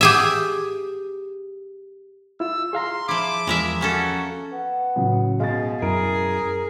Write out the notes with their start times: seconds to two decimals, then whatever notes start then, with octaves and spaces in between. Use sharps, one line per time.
0.01 G4 G#4 E5
2.40 E4 F4 E6
2.73 G#4 F5 A#5 C6
3.08 F3 E4 D6
3.47 E2 F3 G#3 A#4 E5
3.81 A#3 C#4 F#4 A4
4.52 B3
4.96 A2 C#3 F#3
5.40 B2 G#3 F5 A6
5.82 F#2 E4 G#4 A#4 D7